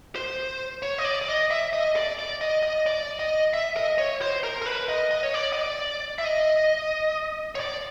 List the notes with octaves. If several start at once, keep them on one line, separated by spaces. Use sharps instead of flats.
C5
C#5
D#5
D5
D5
D#5
E5
D#5
D5
D5
D#5
D#5
D5
D#5
E5
D#5
C#5
C5
A#4
A#4
B4
D#5
D#5
C#5
D5
D#5
D5
E5
D#5
C#5
D5